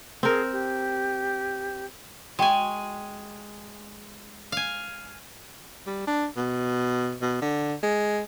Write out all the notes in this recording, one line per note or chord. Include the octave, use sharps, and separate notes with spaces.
C4 G#4 A#4
G4
G#3 F#4 G5 G#5 C#6
F5 G#5
G3
D4
B2
B2
D3
G#3